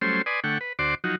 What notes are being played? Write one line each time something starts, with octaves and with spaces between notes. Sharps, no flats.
F#3 G3 A3 C#4 C5 C6
B4 D5 G#5 C6 D#6
D3 A3 F#5 G5 C#6
B4
D2 F#4 C5 D5 C6 D6
F3 F#3 D#4 F#4